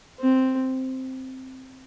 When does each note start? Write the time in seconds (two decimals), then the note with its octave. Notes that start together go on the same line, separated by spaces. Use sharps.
0.20 C4